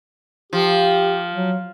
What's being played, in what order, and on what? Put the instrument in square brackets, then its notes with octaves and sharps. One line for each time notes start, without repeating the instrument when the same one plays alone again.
[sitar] F3 [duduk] G4
[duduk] F#3